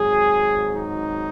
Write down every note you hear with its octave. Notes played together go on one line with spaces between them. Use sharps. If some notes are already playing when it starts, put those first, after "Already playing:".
Already playing: G#1 G#2 F#3 G#4
D#4